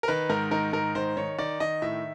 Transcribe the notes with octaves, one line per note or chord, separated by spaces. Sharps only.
A#4
D#3 B4
G#2 A#4
D#3 A#4
G#2 A#4
D#3 C5
D#3 C#5
D#3 D5
D#3 D#5
A2 E5